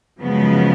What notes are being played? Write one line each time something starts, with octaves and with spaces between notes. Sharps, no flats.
F#2 C#3 F3 G#3 B3